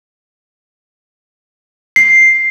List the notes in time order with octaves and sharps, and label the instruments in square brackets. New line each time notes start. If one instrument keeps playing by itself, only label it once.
[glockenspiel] C7